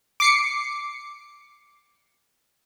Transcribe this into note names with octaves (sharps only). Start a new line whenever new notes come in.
D6 C7 C#7